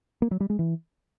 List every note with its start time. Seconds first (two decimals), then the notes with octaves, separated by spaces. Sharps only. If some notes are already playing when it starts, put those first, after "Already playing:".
0.22 A#3
0.31 F#3
0.40 G3
0.50 G#3
0.59 E3